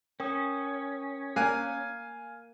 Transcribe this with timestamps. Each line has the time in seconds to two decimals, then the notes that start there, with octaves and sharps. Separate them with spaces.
0.20 C#4 A#4 G5 D#6
1.36 A#3 F5 G#5 F#6